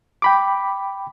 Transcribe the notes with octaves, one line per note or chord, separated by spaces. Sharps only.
G5 B5 D6